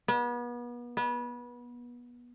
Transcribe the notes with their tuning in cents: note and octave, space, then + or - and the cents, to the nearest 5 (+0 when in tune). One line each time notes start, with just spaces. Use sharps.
B3 -35
B3 -25